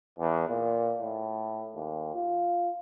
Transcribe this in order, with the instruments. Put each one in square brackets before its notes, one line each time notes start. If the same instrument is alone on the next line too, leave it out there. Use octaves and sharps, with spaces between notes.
[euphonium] E2
A#2
A2
D#2
F4